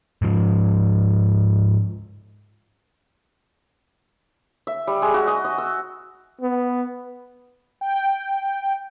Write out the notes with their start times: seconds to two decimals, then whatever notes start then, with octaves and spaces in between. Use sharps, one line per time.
0.22 G#2 F3
4.67 E5
4.87 G3
5.02 G#3
5.14 F#4
5.27 D#5
5.45 D#5
5.58 E6
6.41 B3
7.81 G5